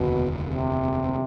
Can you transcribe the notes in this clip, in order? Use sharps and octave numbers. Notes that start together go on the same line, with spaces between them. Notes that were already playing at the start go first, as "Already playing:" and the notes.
Already playing: F1 D#2 B2 D3
C3